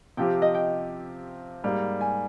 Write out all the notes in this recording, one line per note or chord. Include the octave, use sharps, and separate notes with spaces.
C3 F3 C4 G4 G5
D#5
G5
G#2 G3 A#3
G#5